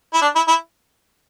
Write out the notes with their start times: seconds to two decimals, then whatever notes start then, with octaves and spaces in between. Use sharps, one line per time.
0.13 E4
0.22 D4
0.36 E4
0.48 E4